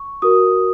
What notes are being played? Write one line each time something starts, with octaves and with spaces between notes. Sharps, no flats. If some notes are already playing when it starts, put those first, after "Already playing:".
Already playing: C#6
F#4 A#4 D#6